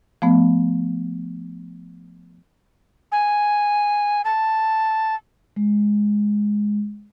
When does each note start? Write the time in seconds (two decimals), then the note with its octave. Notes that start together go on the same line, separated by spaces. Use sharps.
0.22 F3 A3 B3
3.12 G#5
4.25 A5
5.56 G#3